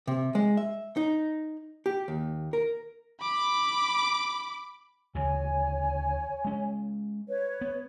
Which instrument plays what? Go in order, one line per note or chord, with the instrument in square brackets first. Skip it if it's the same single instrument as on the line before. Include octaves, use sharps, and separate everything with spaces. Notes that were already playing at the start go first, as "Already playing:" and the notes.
[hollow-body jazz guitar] C3
G#3
E5
D#4
G4
D#2
A#4
[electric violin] B5 D6
[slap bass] D2 C#3 E3 [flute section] C#5 G#5
[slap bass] G#3 C#4
[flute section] B4 C#5
[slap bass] B3